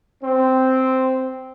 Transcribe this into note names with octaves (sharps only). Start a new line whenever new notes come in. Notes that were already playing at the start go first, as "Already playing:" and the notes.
C4